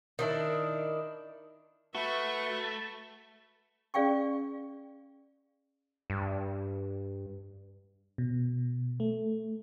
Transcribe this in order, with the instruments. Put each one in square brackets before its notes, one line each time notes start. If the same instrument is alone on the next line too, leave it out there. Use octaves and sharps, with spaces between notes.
[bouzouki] D#3 D4 E4
[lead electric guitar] A3 [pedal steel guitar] F#4 [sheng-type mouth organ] B4 C#6 [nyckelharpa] E5
[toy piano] C#4 G#4 D5 F5 G5 C#6
[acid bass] G2
[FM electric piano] B2
A3